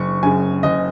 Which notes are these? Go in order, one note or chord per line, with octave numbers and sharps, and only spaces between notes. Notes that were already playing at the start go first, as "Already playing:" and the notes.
Already playing: F#1 C#6
F#2 C#3 G#5
F#1 D#5